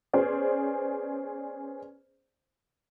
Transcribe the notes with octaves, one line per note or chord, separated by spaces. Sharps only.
B3 C#4 G#4 C5 D5